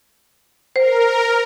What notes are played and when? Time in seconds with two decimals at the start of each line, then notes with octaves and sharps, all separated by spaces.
0.76 A#4 C5